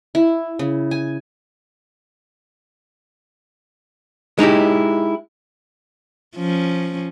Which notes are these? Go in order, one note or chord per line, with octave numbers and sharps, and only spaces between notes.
E4
C#3
G#5
G#3 D#4 E4 G4
F3 C#4